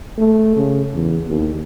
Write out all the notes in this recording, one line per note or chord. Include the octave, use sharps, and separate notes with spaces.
A3
C#3
E2
D#2